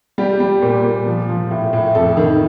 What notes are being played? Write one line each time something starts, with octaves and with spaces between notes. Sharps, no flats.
G3 G4
G3
A#2
A#2
F3
F3
A2
A2
F2 A4
D#3